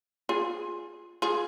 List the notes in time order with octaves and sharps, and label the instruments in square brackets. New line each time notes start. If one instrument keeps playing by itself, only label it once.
[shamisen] F4 G#4
F4 G#4